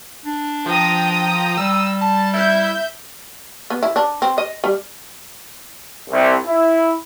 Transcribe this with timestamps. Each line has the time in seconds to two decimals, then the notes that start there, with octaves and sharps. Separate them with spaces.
0.25 D4
0.66 F3 G5 A#5 D#6
1.57 G3 E6
2.01 A5
2.34 E4 E5 G6
3.70 B3
3.83 E4
3.96 D4
4.22 C4
4.38 D#5
4.64 G3
6.10 C2
6.45 E4